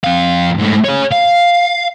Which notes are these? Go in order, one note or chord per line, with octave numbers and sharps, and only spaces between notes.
F2 F5
G#2 A3
G#4 C#5
F5